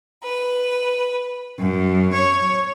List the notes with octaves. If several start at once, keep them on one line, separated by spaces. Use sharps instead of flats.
B4
F#2
C#5